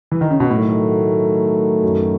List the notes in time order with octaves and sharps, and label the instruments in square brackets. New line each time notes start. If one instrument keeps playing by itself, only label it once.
[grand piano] E3
D#3
C#3
B2
[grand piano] A2 [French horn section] D#3 F#3 A3
[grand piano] F#2